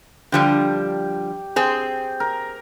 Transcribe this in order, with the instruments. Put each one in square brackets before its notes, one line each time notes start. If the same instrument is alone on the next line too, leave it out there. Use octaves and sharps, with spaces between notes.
[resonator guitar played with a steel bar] D3 F3 G3 [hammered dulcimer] G4
[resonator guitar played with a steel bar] C4 G#4 [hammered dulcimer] G5
[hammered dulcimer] A#4